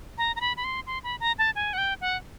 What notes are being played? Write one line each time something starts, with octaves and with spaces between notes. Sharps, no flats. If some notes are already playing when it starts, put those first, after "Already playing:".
A#5
A#5
B5
B5
C6
C6
B5
A#5
A5
G#5
F#5
G5
F#5